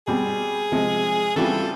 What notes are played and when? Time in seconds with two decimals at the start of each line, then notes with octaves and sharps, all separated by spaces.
0.07 B2 G3 C4 G#4
0.72 C3 F3 G#3
1.36 C#3 E3 G3 C4 F4 A4